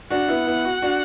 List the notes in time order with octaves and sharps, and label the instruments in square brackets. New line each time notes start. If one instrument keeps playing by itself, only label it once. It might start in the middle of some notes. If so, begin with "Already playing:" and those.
[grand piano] D4 F#4 [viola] F#5
[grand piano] B3 E4
B3 E4
F#4
D4 F#4